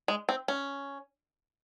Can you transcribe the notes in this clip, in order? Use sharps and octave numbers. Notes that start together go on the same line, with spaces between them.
G#3
C4
C#4